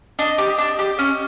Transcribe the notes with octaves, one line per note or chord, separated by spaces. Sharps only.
D4 D#5
G4
D4
G4
C#4